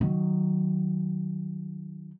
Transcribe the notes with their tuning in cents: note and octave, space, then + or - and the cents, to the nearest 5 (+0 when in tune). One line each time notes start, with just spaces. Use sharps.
D#3 +0 F#3 +10